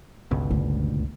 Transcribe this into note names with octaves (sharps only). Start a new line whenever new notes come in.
G1 C#2 B2
D2